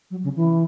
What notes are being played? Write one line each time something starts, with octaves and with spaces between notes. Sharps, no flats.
F#3
C#3
E3